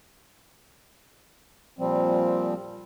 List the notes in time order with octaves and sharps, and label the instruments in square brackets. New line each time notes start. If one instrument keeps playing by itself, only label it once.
[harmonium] A#2 F3 G3 C4